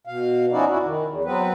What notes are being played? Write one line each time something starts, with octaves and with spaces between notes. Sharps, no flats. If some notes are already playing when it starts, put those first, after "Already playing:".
B2 F5
F3 C#4 D#4 E4 F#4 D5
F2 E4 F#4
D#3
E2
F#3 B3 C4 B4